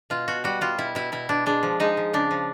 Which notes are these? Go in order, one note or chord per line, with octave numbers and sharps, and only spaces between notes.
B2 F4
B2 F#4
G3 F#4
G3 F4
B2 E4
B2 E4
B2 E4
B2 D4
G#3 D4
F3
G#3 D#4
F3
C#3 D4
F3